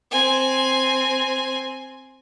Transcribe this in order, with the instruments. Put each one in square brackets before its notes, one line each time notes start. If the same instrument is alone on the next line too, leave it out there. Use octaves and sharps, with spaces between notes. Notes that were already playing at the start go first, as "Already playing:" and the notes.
[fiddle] C4 G#5